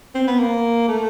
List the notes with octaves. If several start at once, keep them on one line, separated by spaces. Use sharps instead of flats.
C4
B3
A#3
A3